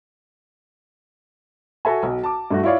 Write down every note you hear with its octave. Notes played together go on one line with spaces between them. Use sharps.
F#4 A4 E5 G#5
B1
A5 D6
G2 A3 F#4
E4 F4 C#5 D5 F5